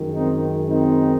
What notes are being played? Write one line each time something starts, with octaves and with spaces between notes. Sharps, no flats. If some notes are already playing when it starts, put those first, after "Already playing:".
Already playing: F#2 D#3 G#3
C4 D#4
C4 D#4